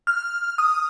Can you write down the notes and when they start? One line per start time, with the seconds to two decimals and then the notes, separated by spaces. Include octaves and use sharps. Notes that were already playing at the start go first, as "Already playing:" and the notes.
0.07 F6
0.58 D#6